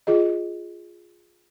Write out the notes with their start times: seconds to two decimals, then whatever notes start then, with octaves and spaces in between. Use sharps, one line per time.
0.07 F4 G#4 D#5